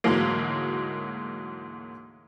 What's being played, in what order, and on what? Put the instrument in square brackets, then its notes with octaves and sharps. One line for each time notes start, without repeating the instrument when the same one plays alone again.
[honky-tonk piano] D2 G#2 E3 F#3 A#3